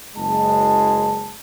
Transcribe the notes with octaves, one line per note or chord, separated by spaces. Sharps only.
F#1 G#3 A5